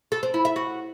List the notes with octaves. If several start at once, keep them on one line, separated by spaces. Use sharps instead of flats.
A4
C4
E4
E5
F#4